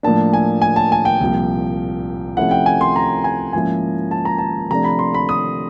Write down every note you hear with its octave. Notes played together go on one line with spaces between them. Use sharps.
A2 F3 A#3 D4 A5
G#5
G#5
A5
G#5
G5
C2 A#2 F3
C3 F3 A3 C#4 E4 F#5
G5
G#5
C6
A#5
G#5
G#2 F3 A#3 C#4 E4 G#5
A5
A#5
A5
C3 F3 A3 D4 A#5
B5
C6
B5
D#6